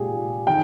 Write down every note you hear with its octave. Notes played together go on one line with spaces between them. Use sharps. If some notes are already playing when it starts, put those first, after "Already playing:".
Already playing: A#2 G#3 G4 G#4
D#3 G5